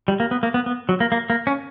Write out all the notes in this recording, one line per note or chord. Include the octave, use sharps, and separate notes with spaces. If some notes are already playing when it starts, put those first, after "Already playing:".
G3
A#3
B3
A#3
B3
B3
F#3
A#3
A#3
A#3
C#4